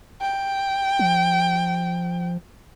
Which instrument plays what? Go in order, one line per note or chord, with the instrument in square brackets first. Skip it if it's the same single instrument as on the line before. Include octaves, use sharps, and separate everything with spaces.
[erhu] G5
[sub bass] F3